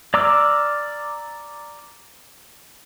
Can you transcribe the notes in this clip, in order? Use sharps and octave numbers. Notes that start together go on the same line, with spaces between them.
D5 A#5 D6 E6 F6